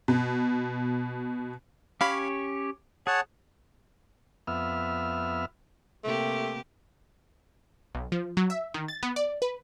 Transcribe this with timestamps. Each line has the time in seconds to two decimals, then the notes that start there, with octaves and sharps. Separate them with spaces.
0.08 B2
2.01 C#4 G4 C#5 F5 B5
3.07 G#4 C#5 F#5 A5
4.47 F2 B3 E5 F6
6.04 C3 A3 A#3 G4
7.95 B1
8.12 F3
8.37 F#3
8.50 E5
8.74 D#3
8.88 A6
9.03 B3
9.16 D5
9.42 B4